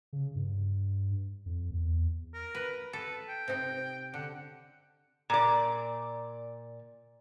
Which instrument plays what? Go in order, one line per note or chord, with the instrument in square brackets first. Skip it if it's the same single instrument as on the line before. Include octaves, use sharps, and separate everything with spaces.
[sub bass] C#3
G2
F2
E2
[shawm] A#4
[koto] B4
[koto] A4 [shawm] B4
[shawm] G5
[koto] C3 C4 D#4
[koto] D3 [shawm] F#5
[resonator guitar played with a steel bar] A#2 D5